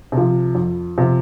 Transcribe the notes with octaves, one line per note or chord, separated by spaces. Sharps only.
C3
F3
F2
C3 F3